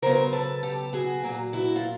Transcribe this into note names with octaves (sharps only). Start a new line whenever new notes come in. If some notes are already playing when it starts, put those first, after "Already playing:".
C#3 F#3 B3 A#4 C5
A4 B4
G4 A4
F#4 G#4
A#2 F#3 A#3
E4 F#4
F4